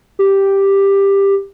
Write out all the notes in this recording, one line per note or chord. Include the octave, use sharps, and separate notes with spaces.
G4